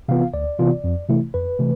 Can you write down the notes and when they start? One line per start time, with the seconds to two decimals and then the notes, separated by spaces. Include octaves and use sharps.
0.09 C3 E3 B3 F4 F5
0.34 D2 D5
0.59 C3 E3 B3 F4
0.84 F2
1.09 C3 E3 A3 E4
1.34 F2 B4
1.59 C3 E3 A3